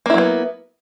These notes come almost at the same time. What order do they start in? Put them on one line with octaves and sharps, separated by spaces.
A#3 E4 F#3 B3